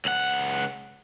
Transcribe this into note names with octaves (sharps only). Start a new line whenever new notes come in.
C#2 F#5